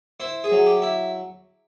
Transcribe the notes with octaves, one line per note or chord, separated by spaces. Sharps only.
E4 C5
G#4
F#3
G4
E4